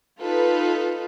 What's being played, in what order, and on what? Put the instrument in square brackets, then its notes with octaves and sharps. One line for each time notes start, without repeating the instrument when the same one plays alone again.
[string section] D#4 A4 B4 [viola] F4